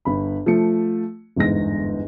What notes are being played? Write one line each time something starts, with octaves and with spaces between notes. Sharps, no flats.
G1 B5
F3 A3 C#7
G1 E2 G#2 A#6